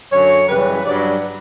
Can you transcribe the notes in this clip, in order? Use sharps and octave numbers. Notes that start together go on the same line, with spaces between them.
F#2 D3 F#3 C#5
F#2 C#3 E3 G3 B4
G2 F#3 D5